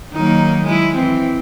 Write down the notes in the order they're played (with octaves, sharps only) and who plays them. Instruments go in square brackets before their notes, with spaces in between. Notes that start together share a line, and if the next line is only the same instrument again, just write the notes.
[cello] D#3 F#3 [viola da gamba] A#3 D#4
[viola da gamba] G#3 E4
[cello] E3 [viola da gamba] C4